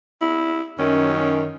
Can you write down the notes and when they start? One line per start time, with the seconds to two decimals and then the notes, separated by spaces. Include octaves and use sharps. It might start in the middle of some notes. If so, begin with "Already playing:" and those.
0.21 E4
0.79 F#2 D#3 C#4